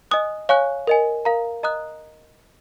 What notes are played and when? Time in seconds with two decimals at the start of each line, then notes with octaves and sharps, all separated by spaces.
0.11 D#5 G#5 D#6 F#6
0.49 C#5 F5 G#5 C#6 F#6
0.87 A#4 D#5 G#5
1.25 A#4 F5 A#5
1.63 D#5 A#5 D#6 F#6